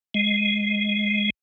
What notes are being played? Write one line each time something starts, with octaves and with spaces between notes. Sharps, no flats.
G#3